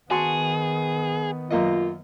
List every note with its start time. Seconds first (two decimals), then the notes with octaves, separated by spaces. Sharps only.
0.11 D#3 B3 F#4 G#4 A5 C6
1.51 F#2 A#3 F4 D#5